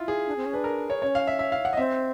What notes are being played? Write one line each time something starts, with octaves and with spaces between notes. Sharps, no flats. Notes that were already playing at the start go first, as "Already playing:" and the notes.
Already playing: E4 F4
G#4
D4
C4
C#4
D4 B4
A#4
C#5
C#4 C#5
F5
E5
E5
F5
F#5
D#5
C4 E5